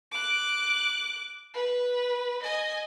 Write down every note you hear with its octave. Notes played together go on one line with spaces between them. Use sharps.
D6 F#6
B4
D#5 G#5